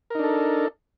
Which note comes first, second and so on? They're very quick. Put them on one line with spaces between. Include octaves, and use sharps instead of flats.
A#4 D#4 D4 A4